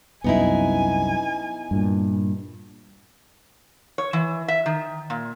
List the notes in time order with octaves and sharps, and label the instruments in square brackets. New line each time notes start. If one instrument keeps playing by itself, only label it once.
[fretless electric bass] C2 F#2 [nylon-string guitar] B3 D#4 E4 [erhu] G#5
[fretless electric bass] G2 A#2
[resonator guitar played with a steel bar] C#5
E3
E5
D#3
A#2